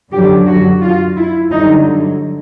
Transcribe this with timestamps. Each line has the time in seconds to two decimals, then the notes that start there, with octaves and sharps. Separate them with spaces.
0.11 F#2 D3 F#3 G4
0.47 F#4
0.82 F4
1.16 E4
1.51 G2 D3 F#3 D#4